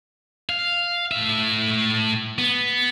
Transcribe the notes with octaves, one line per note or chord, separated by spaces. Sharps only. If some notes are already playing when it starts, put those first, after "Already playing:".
F5
A2 E5
B3